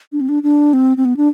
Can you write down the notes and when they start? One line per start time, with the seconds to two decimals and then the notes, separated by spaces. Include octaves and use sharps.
0.12 D4
0.21 C4
0.29 D4
0.43 D4
0.73 C4
0.97 C4
1.05 B3
1.17 D4